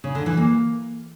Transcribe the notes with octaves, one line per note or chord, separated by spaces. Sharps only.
C#3
D3
E3
A#3